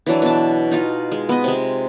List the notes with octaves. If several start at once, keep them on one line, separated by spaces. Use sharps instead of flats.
E3 F#3 D4
B2 A5
D#4 F4 F5
G#3
B3 D#5
C3 G#3